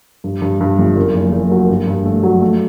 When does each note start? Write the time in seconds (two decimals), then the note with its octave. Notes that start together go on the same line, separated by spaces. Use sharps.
0.24 G2
0.42 G2
0.61 G2
0.79 G1
0.96 F#2
1.14 F#1
1.32 F#1
1.51 F#3
1.69 G2
1.87 G2
2.05 A3
2.23 F#3
2.42 A3